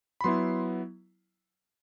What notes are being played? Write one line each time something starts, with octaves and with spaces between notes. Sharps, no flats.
B5
F#3 B3 E4 C6